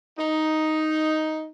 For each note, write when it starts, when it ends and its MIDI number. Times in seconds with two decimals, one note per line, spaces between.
0.19 1.50 63